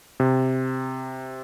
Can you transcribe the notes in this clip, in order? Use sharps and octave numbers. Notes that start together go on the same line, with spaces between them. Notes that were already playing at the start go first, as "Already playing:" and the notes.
C3